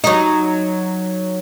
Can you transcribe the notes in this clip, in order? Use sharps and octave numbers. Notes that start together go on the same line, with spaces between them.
F#3 D#4